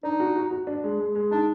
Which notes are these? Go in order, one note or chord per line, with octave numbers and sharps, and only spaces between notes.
D4 D#4
F#4
F#4
F#4
D4
G#3
G#3
G#3
D4 D#4